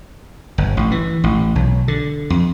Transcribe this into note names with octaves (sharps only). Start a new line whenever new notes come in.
G1
A1
E3
A1
B1
D3
F2